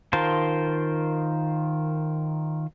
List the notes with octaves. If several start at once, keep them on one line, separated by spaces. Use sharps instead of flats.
D#3 F4 A#4 C5 A5